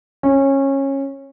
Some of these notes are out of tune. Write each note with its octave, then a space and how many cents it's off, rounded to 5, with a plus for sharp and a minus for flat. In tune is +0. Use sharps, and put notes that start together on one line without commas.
C#4 -20